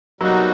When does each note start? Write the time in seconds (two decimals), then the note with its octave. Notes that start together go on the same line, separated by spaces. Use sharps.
0.21 B2 F#3 G3 A#3 D#4 F#4